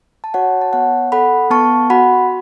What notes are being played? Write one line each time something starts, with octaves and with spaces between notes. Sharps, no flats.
A5
F#4 C#5 F#5
A5
B3 C#5 F#5
A4 F#5 B5
B3 A5 C#6
F#4 F#5 B5